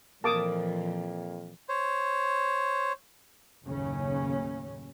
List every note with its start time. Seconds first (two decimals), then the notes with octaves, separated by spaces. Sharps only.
0.24 F2 A#2 E3 F3 A#3 A5 D6 D#6
1.69 C5 C#5
3.64 F#1 D#2 A2 C#3 C#4